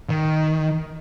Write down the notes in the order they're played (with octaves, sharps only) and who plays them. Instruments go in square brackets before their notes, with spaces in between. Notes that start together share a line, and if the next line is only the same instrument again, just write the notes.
[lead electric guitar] D#3